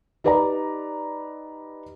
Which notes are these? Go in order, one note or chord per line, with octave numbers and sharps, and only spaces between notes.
D#4 G4 B4 D5 D#5 A#5